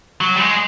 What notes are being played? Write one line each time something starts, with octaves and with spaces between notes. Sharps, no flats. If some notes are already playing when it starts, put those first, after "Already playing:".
F#3
G3
G#3